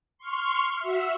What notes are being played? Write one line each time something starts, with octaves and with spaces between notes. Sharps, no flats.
C6 C#6 F6
F#4 E5